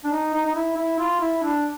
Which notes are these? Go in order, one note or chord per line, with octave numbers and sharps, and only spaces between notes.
D4
D#4
D#4
D#4
E4
E4
F4
E4
D4